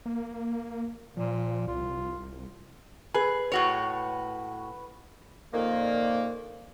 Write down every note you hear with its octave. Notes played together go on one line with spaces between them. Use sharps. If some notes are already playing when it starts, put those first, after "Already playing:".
A#3
A#2 F3
C2 F4
G#4 B4
A2 F#4 C#5
F2 A#2 D#3 A#3